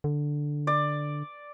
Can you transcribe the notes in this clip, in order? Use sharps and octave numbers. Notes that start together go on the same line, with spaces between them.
D3
D5